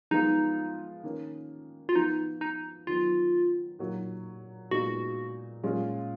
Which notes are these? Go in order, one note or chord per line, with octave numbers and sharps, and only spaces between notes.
F3 G#3 B3 D#4 F4
D#3 A#3 C#4
F4
F3 B3 D#4 F#4
D#4
D#3 F#3 B3 F4
A#2 F#3 A#3 D#4 F#4
A#2 G#3 B3 D#4 F#4
A#2 G#3 C#4 F4